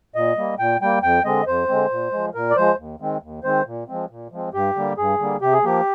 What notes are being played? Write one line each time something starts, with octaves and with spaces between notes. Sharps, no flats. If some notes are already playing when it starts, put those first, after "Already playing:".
A#2 D#5
G3 A#3
A#2 G5
G3 A#3 G5
F2 G5
D3 G#3 C4 D#5
F2 C5
D3 G#3 C4
A#2
F3 G#3
A#2 A#4
D5
F3 G#3 C5
D#2
D#3 G#3 C4
D#2
D#3 G#3 C4 C5
A#2
F3 G#3 C4
A#2
F3 G#3 C4
G2 G4
D3 G3 A#3
G2 G#4
D3 G3 A#3
C3 G4
G#4
F3 A#3 G4